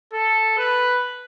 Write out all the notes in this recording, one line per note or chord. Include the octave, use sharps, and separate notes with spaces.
A4
B4